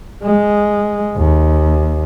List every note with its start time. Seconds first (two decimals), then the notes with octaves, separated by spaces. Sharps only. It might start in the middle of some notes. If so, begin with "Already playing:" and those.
0.23 G#3
1.17 D#2